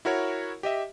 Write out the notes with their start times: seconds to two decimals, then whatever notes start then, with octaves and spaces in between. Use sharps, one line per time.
0.05 E4 F#4 A#4 C#5
0.63 G4 D#5 E5